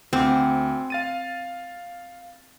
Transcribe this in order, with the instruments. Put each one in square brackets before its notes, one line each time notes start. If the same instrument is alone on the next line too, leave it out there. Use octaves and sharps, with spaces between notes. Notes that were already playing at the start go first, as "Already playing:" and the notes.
[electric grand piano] D2 F#5 D6 [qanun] C4
[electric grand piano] F5 A6 D#7